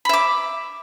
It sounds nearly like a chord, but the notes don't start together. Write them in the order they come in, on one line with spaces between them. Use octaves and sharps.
B5 E5 D6